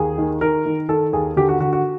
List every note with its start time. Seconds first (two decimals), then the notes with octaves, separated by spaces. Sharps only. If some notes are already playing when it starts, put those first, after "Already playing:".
Already playing: D#2 G#4
0.18 D#3
0.41 D#3 A#4
0.66 D#3
0.89 D#3 A4
1.13 D#2 G#4
1.36 D3 G4
1.49 F#4
1.60 D3 F#4
1.73 F#4